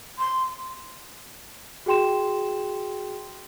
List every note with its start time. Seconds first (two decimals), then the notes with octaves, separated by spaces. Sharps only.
0.19 C6
1.86 F#4 G#4 G5 C6 E7